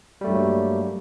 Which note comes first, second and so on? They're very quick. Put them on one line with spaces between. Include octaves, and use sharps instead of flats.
G3 A3 G2 F#3 A#3